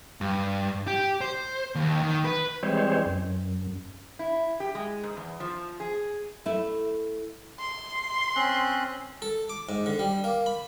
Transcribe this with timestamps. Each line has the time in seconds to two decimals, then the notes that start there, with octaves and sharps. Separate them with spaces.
0.21 G2
0.87 G4
1.21 C5
1.75 D#2
2.02 D#3
2.25 B4
2.63 E3 G3 G#3 C4 C5 C#5
3.06 F#2
4.19 E4
4.60 G4
4.75 G#3
5.03 G#2
5.17 E2
5.40 F3
5.80 G#4
6.46 A3 E4
7.59 C6
8.36 C4 C#4 F#6
9.22 A4
9.49 D6
9.69 G#2
9.86 D3
9.99 G3
10.24 A#3
10.46 B5